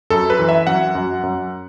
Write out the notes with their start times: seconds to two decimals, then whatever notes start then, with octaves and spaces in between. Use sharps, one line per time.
0.10 F#2 A4
0.30 B4
0.39 E3
0.49 E5
0.67 F#2 F#5
0.95 F#2
1.23 F#2